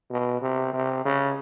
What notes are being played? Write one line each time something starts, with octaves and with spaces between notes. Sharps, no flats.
B2
C3
C3
C#3